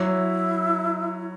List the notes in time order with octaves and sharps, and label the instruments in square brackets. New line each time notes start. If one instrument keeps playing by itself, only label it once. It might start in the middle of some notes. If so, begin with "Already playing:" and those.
Already playing: [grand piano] F#3 [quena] E4